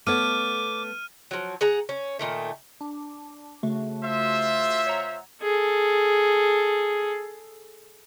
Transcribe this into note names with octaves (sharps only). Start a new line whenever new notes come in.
A3 B3 C#5 D6 F6 D#7
F3 F#3
G#4 F#5 A#5
C#4
A#2 D#3 A3
D4
C#3 A3 F#4
F4 C5 E5
C#5 F#5 A#5
G#4 A4